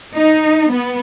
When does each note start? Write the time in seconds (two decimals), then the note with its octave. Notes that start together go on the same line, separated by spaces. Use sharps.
0.15 D#4
0.70 B3